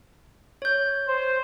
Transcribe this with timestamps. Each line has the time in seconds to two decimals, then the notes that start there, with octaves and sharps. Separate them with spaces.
0.62 C#5 G6
1.08 C5